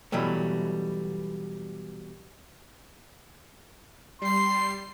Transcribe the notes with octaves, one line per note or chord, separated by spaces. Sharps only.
B2 E3 F#3 G3 A3
G3 C6 C7